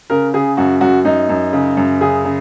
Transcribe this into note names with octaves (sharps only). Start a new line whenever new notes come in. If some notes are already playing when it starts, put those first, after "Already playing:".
C#3 A#4
C#3 G#4
F#2 F#4
F#2 F#4
F#2 D#4
F#2
C#3
F#2
C#3 G#4
C#3